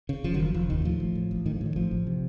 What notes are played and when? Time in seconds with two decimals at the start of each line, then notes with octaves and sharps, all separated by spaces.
0.09 C#3
0.24 F1 F3
0.34 D#3 F#3
0.39 F1 F3
0.54 F1 F3
0.70 D#2 D#3
0.85 A2 F3
1.00 A1
1.15 A2
1.31 A1
1.46 A2 D#3
1.56 F3
1.61 A2 D#3
1.76 A1 F3
1.91 A1
2.07 C3